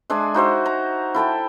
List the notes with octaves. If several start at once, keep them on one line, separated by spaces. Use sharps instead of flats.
G#3 D4 E5 G#5
D#4 F#4 C5 E5
A#5
E4 A4 G5 A5